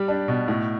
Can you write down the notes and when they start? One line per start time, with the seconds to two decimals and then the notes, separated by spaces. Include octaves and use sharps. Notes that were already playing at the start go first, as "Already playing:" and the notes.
Already playing: G3 G4
0.08 D4
0.28 B2
0.48 A2